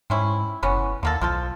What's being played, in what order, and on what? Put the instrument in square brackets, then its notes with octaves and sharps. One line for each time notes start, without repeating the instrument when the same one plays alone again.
[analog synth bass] G#2 [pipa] C4 C#4 E4
[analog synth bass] F#1 [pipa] E3 B3 C#4
[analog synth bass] D#2 [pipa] D3 A#3 A4
[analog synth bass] B1 [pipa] F3 F4 A4